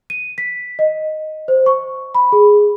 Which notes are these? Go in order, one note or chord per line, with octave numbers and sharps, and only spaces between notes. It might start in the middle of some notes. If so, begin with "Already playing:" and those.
D#7
B6
D#5
C5
C#6
B5
G#4